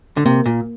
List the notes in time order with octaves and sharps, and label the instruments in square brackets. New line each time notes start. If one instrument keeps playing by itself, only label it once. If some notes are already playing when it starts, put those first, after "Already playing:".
[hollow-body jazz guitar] D3
[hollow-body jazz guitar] C3 [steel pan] A#3
[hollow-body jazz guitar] A#2